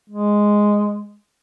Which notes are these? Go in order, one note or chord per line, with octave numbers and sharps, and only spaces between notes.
G#3